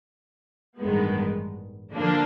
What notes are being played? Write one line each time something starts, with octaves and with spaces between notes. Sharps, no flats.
A1 G2 D#3 G#3 B3
D3 F3 A#3 D4